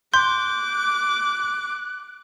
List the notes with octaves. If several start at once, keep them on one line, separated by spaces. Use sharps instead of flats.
C6 D6 F#6 G6